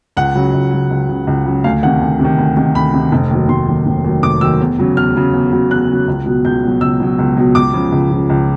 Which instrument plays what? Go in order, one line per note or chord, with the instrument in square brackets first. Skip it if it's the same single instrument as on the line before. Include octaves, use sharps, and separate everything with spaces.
[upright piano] C#2 F#5
C#3 F#3
C#2
C#3 F#3
C#2
C#3 F#3
C#2
C#3 F#3
D2 F5
C3 D#3 F#5
D2
C3
D#3
D2
C3 D#3
D2 B5
C3 D#3
F1
D#2 D#3 F#3
F1 C6
D#2 D#3 F#3
F1
D#2 D#3 F#3
F1 D6
D#2 D#3 F#3 E6
E2
C#3 F#3
E2 F6
C#3 F#3
E2
C#3 F#3
E2 F#6
C#3 F#3
C#2
B2 F#3
C#2 G6
B2 F#3
C#2 E6
B2 F#3
C#2
B2 F#3
C#2 D6
C#3 F3
C#2
C#3 F3
C#2